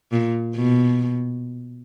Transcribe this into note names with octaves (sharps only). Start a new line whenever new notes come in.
A#2
B2